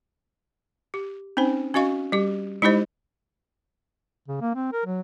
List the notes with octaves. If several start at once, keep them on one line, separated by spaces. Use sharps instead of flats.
G4
C4 C#4 D#4 C5
C#4 F#4 D#5 F5 C#6
G3 G4
G#3 D#4 E4 G4 C5 D#5
C#3
A#3
C4
A#4
F#3